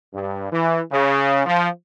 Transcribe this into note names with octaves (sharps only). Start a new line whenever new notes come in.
G2
E3
C#3
F3